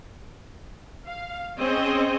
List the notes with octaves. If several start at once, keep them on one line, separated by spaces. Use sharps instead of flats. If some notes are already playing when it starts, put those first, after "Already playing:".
F5
C4 C#4 G#4 C5 D#5